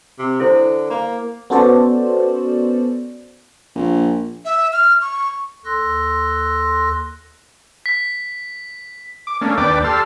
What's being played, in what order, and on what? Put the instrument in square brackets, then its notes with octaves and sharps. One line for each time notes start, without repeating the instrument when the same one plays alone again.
[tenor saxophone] C3
[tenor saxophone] D3 [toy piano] E4 A4 C5
[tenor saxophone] A#3 [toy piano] A#5
[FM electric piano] B3 C#4 F#4 A4 C5 D5
[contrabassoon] A#1
[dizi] E5
F6
C#6
[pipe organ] D#2 A4 C6 E6 F#6 A#6
[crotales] B6
[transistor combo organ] D6
A3 A#3 C#4 D4
D#2 D4 B4 D5 G5 D6
G4 A4 A5 C6 E6 F6